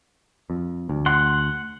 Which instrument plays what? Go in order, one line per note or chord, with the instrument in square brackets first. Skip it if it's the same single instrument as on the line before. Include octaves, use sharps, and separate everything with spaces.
[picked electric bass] F2
D2
[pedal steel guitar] F#5 C6